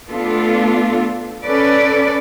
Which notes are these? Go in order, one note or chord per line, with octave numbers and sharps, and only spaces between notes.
A3 B3 D4 F4 A4
C#4 A4 B4 D5